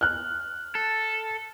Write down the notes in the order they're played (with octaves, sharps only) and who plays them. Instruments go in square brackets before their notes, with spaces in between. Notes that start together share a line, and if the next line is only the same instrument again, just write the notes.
[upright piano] F6 F#6
[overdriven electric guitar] A4